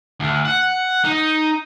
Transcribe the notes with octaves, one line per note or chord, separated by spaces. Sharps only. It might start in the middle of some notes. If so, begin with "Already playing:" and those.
D2
F#5
D#4